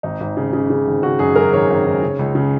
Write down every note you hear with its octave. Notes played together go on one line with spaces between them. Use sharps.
G#1 D#4
G#1
C#3
C#3
C#3
G#1
C#3 F#4
F#2 G#4
F#2 A#4
G#1 C#5
G#1
G#1
C#3
C#2
C#3